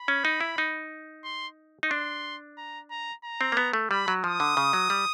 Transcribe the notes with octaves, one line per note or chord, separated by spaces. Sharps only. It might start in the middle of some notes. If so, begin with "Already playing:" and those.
Already playing: B5
C#4
D#4
E4
D#4
C6
D#4
D4 C6
A#5
A#5
A#5
C4
A#3
B3
A3
G3 B5
F#3
F3 D#6
D3
C#3
F#3
G3